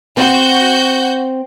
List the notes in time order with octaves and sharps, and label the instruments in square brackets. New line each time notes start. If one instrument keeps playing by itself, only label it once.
[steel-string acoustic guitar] C4 [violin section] F#4 G6